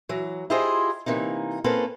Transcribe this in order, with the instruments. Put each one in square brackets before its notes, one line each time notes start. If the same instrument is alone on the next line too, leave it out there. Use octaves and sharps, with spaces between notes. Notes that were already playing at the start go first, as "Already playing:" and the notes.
[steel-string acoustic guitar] E3 F#3
E4 F4 G4 G#4 C5 D#5
C3 E3 A#3 D#4
A#3 C4 C#4 A4 B4